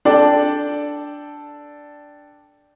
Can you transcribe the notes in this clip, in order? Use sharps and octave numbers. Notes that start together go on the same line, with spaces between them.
D4 A4 D5 G5